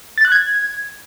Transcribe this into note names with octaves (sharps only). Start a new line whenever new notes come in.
A6
F#6
G#6